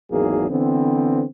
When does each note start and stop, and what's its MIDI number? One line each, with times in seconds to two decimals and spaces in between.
0.11 0.45 32
0.11 0.45 40
0.11 0.45 51
0.11 0.45 54
0.11 0.45 58
0.11 0.45 68
0.50 1.23 50
0.50 1.23 52
0.50 1.23 59
0.50 1.23 60